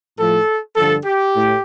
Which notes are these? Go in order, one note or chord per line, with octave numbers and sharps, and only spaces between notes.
A2 F3 A4
G2 D3 F3 A4
G4
A2